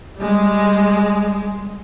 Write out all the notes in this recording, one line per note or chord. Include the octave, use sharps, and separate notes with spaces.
G3 G#3